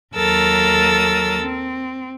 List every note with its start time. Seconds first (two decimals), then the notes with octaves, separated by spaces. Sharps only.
0.14 D#2 F#3 A4 A#4 E6 A6
1.42 C4